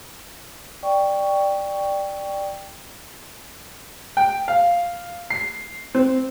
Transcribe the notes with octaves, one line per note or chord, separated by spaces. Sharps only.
D5 G5 C#6
G5
F5
C7
C4